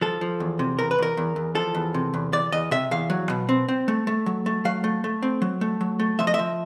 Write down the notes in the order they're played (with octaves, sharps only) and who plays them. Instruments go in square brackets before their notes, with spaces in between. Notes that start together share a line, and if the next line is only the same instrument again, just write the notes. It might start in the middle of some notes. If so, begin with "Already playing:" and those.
[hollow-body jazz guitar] F3 A4
F3
E2
C3
E2 A#4
B4
E2 A#4
E2
E2
F3 A4
E2
C3
E2
E2 D5
E2 D#5
C3 E5
E2 F5
F#3
B2
C4
C4
A3
A3
F#3
A3
F#3 F5
A3
A3
C4
F#3
A3
F#3
A3
F3 E5
D#5
E5
F3